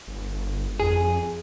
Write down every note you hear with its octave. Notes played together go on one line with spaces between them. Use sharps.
G1
F2 G#4